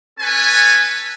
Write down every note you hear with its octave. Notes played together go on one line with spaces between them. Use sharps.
C#4 A4 B4 G#5